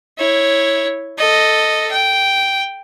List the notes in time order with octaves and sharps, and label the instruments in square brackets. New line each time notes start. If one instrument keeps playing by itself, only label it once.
[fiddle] E4 C#5
A4 D#5
G5